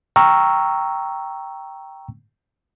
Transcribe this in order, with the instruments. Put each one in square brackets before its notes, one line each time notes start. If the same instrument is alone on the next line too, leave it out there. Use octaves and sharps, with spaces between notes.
[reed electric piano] G5 A#5 C#6 E6 F6